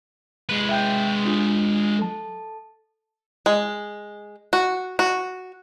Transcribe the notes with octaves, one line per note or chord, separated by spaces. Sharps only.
G#3 B4
E5 G5 G6
D4 F4 G4
A4 A5
G#3
F#4
F#4